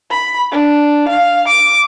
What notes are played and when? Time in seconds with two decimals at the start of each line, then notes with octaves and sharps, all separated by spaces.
0.11 B5
0.51 D4
1.09 F5
1.49 D6